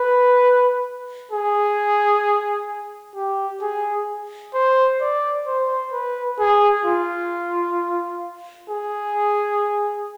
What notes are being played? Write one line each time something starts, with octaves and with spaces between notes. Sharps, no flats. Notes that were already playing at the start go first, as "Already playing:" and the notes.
Already playing: B4
G#4
G4
G#4
C5
D5
C5
B4
G#4
F4
G#4